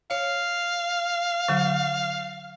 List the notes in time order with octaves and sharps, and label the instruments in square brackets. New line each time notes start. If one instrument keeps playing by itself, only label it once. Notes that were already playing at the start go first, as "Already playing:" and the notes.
[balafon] C#5 [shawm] F5
[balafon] D3 F#3